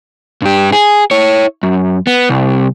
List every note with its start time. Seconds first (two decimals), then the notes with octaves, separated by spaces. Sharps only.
0.42 G2 G4
0.72 G#4
1.11 E4 C#5
1.63 F#2
2.07 B3
2.30 C2